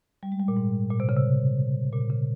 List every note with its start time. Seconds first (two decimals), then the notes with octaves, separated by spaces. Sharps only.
0.23 G3
0.32 G#3
0.40 G3
0.48 A#2
0.57 G#2
0.91 A#2
1.00 C3
1.09 C#3
1.17 C3
1.93 A#2
2.10 C#3